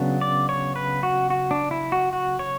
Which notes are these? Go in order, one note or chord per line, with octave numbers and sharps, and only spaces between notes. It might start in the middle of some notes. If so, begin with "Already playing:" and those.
Already playing: C#3 F#3 B3 D4
D5
C#5
B4
F#4
F#4
D4
E4
F#4
F#4
C#5